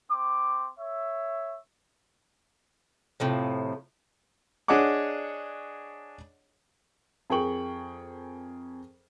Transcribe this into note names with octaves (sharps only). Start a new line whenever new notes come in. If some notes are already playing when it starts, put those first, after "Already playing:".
C4 D6
C#5 E5
A2 C3 F3
D4 G#4 C#5 D#5 F#5 D6
F2 G#4 A#4 G5 C#6 F#7